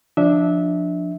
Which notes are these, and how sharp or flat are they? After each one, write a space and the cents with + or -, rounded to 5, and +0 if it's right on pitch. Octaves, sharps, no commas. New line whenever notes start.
F3 +0 D4 +0 E5 -20